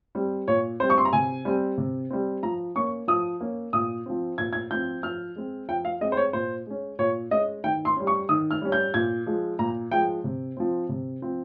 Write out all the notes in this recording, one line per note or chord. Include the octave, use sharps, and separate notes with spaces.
G3 C4
A#2 C#5
G3 C4 C5
C#6
C6
A#5
C3 G#5
G3 C4
C3
G3 C4
F3 A#5
A#3 C#4 C#6
F3 D#6
A#3 C#4
A#2 D#6
F3 C4
A#2 G#6
G#6
F3 C4 G6
F3 F6
G#3 C4
F3 G5
F5
G#3 C4 D#5
C5
C#5
A#2 C5
G#3 C#4
A#2 C#5
G#3 C#4 D#5
D#3 G5
C6
G3 C#4
C#6
D#3 D#6
F6
G3 C#4
G6
A#2 G#6
F3 G#3
A#2 A#5
F3 G#3 G5
C3
F3 C4
C3
F3 C4